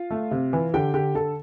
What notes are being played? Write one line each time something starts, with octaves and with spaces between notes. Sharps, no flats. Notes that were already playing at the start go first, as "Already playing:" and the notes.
Already playing: F4 F5
A3
C3
E3
D3 G4 G5
D3 G4 G5
D3 A4 A5